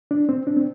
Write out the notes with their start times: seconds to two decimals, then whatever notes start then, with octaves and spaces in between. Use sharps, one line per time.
0.11 D4
0.29 C4
0.47 D4
0.57 C4